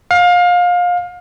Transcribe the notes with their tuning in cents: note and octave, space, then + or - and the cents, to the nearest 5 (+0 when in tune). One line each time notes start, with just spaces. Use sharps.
F5 +25